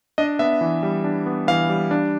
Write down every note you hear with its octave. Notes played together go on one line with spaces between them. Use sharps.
D4 D#5
B3 E5
E3
G3
D4
B3
E3 F5
G3
D4